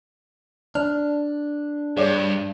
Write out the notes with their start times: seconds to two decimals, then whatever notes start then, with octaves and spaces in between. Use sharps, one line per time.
0.75 D4 F6
1.97 G2 G#4 C#5 D5